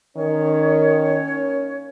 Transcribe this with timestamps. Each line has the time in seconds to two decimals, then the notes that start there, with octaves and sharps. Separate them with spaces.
0.17 D#3 A#3 C#4 C#5